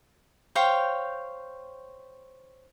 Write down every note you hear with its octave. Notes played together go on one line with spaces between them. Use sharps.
C5 C#5 F5 G5